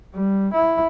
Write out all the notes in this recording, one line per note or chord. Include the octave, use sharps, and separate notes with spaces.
G3
E4